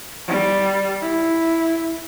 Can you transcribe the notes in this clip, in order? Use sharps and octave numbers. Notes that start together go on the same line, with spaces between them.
G3
E4